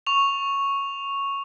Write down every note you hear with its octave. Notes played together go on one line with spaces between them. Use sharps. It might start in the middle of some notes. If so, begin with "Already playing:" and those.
C#6 F7